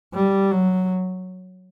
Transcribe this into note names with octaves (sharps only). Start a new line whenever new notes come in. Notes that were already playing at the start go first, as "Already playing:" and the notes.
G3
F#3